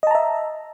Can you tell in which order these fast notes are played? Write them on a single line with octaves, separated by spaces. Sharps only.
D#5 A5 A#5 E5